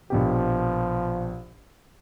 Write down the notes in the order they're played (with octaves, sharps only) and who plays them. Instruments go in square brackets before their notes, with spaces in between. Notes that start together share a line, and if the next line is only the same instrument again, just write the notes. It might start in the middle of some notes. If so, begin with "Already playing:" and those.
[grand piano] A#1 B2 G4 [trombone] F3